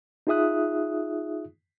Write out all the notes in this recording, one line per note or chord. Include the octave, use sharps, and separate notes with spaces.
D#4 F4 G#4 E5 D#6 F#6